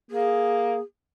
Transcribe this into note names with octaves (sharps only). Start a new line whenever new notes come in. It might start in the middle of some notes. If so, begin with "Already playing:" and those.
A#3 G#4